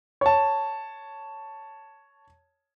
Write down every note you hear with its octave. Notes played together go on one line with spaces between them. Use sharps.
C#5 A5